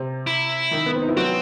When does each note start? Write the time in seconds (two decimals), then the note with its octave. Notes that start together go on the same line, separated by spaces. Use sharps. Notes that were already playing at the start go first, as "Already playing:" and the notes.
Already playing: C3 C4
0.27 E4
0.71 D#3 D#4
0.86 B3
0.95 C4
1.02 D#4
1.09 E4
1.17 F#3 C4 F#4